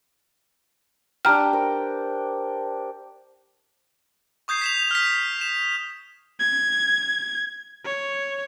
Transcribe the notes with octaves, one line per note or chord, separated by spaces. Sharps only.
D4 G4 G5 A#5 F6
A#4 C5
C#6 D#6 G6 G#6 C7
B6 E7 F7
F6 B6
E7
G#6
C#5